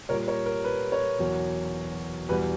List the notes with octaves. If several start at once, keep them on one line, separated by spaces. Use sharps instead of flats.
A#2 G3 A#4 C#5
A#4 C#5
A#4
B4
A#4 C#5
E2 B2 F#3
E2 B2 G3 B4